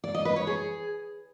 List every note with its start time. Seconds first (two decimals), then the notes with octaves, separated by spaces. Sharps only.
0.04 D5
0.14 D#5
0.25 B4
0.36 C#5
0.47 G#4